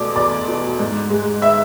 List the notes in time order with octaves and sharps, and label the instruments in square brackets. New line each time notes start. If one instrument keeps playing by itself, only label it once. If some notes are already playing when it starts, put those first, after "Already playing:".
Already playing: [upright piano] E2 B2 A3 D5 D6
E2 D5 D6
B2 A3
G#2
G#3
E5 E6